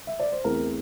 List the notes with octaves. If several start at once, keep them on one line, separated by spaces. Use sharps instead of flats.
E5
D5
C5
E2 E3 A3 C4 A#4